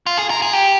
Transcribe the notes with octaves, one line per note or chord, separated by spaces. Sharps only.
F4
G#4
A#4
G#4
G4